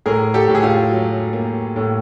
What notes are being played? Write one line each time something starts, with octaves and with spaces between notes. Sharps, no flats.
A2 G#4 A#4
G4 A4
A2
G#4
F4 G4
F#3
A#3
A2